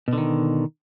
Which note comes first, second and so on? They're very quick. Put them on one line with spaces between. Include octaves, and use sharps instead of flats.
B2 D3 D#3